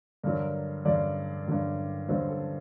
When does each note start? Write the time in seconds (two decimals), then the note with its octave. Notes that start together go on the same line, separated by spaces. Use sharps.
0.23 G2 D3 F#3 A#4
0.85 G2 D3 F#3 D5
1.47 G2 D3 F#3
2.09 G2 D3 F#3 C5
2.29 A4